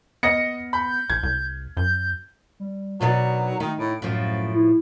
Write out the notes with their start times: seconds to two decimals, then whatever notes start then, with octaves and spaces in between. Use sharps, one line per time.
0.23 B3 D#5 A#6 C#7
0.73 B5 G6
1.10 A#1 G#6
1.23 C2
1.77 F#2 G6
2.60 G3
3.01 B2 F#3 D4 D#4 A#4
3.60 D#3 A3 D#4
3.79 A2 D7
4.02 F#2 A2 F3
4.55 E4